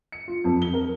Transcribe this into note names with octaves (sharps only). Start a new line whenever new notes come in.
C#7
F4
F2
G7
A#4